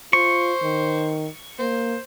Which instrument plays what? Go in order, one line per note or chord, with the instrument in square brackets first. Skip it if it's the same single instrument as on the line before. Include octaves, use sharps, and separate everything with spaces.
[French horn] F4 [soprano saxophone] C5 [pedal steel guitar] C#6
[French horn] D#3
[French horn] A#3 [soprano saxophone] C5